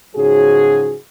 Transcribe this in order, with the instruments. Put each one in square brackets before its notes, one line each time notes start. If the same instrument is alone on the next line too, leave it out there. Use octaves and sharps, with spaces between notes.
[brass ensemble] G#2 C#3 F3 F#3 F#4 G#4